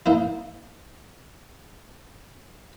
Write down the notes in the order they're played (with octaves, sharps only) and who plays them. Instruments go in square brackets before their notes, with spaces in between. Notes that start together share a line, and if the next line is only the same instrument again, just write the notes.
[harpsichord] A#3 D#4 E4